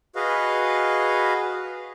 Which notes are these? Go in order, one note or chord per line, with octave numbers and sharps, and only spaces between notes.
F#4 G#4 B4 D#5 F5